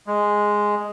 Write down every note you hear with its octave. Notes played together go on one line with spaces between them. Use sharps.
G#3